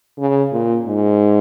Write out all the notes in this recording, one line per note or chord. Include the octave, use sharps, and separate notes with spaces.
C#3
A#2
G#2